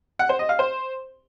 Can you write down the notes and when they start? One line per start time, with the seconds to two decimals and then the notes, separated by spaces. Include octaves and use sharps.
0.19 F#5
0.29 C5
0.39 D#5
0.49 F5
0.59 C5